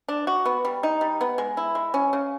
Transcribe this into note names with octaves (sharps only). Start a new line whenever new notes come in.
D4
F#4
B3
G3
D#4
G3
B3
G#3
E4
G#3
C#4
C#3